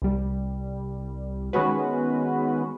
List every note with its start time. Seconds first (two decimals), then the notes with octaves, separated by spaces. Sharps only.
0.02 C2 G3
1.53 D#3 G#3 B3 C#4 F#4 B4